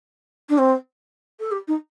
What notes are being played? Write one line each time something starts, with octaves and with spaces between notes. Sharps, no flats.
D4
C4
A4
G4
D#4